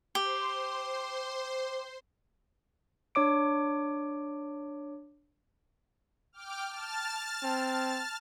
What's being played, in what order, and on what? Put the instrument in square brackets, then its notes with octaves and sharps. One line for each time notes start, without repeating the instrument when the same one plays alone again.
[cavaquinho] G4 [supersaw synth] C5 C6
[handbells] D4 C#5 D6 D7
[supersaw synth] G5 D6 F6
A5 F6 A6
[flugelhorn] C4